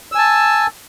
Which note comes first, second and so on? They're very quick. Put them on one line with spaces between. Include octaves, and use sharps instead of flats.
E6 G#5 A5